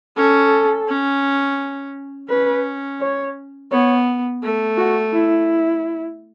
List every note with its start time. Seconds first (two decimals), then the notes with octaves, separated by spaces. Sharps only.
0.17 C#4 A4
0.88 C#4
2.29 C#4 B4
3.01 C#5
3.71 B3 C#5
4.43 A3
4.77 F#4
5.14 E4